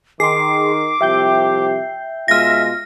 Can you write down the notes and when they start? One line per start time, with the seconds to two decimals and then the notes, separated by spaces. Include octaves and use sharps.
0.20 D#3 G#4 C6 D6 C7
1.01 C2 F3 G4 E5 G5 G6
2.28 B2 G#3 F4 E5 F6 A#6